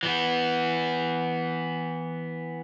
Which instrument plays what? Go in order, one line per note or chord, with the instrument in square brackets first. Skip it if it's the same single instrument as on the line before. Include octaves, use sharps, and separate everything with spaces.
[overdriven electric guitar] E3 B3